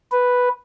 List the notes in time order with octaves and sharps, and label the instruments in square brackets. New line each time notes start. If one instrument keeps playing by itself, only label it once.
[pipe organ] B4